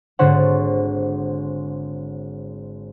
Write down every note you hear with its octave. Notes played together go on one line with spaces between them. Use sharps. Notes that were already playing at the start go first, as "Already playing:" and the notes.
G#1 D3 A4 C5 C#5 F#5